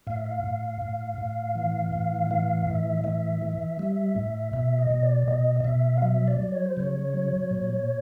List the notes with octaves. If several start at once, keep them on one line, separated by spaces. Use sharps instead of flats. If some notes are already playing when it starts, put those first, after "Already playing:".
A2 F5
E5
F5
A2
A2
A2
E3
A2
E3 F5
A2 E5
E3 E5
E3
G3
A2
B2 E5
D#5
B2
D5
B2 D#5
D#5
B2 E5
F5
F#3 E5
D5
F#3
C#5
C5
C#3 C#5
F#3
A#2